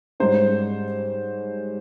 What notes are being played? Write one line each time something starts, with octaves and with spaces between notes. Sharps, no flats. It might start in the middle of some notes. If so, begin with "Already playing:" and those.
G#2 G3 C#4 C5